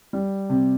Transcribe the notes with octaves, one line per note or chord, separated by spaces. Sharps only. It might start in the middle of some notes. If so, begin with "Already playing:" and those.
G3
C3